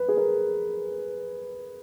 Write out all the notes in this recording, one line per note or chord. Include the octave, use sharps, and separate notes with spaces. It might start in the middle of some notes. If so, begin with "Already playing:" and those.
Already playing: B4
G#4
A#4